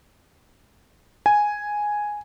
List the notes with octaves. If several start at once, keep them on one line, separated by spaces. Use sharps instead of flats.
G#5